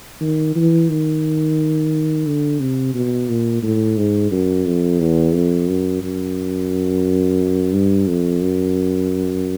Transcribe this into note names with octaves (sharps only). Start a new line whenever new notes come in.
D#3
E3
D#3
D3
C3
B2
A#2
A2
G#2
F#2
F2
E2
F2
F#2
F#2
G2
F2
F#2